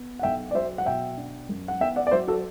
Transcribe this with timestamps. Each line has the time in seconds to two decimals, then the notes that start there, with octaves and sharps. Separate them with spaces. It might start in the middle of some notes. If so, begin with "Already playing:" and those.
Already playing: B3
0.19 F#5
0.23 B1 E5 G5
0.51 D5
0.55 F#3 C5 E5
0.78 F#5
0.86 B2 E5 G5
1.17 D4
1.49 F#2
1.68 F#5
1.80 B3 E5 G5
1.96 D5 F#5
2.07 D5
2.11 F#3 C5 E5
2.27 F#4 A4